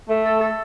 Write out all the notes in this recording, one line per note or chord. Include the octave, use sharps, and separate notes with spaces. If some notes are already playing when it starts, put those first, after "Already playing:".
A3
A4
A4